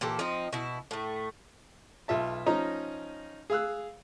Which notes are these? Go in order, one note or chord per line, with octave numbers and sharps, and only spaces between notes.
A#2 E3 G4 A4
F3 C4 D#4
B2 E4
A2 A3
B1 F4 E5 A5
F3 C#4 D#4 D#5 A#5
G#4 F5 E6 F#6